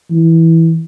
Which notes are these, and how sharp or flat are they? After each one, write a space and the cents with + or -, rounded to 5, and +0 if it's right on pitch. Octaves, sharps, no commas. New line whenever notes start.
E3 -10